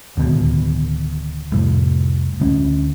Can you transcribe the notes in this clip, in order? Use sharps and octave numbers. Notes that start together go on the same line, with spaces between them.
D1 D#2 B2
C2 F2 A2
D2 A#3 C#4